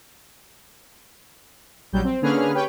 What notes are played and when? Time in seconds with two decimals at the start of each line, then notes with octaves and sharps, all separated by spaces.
1.92 A#1 F#3 G3 G6
2.04 C4
2.22 D3 A#3 C#4 G#4 B4 F6
2.54 G4 B4 C#5 G5